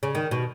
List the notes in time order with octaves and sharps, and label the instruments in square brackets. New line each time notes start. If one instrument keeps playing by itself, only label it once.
[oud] C#3
D#3
B2